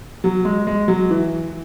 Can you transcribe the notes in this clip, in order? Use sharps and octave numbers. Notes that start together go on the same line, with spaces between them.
F#3
G#3
G#3
F#3
E3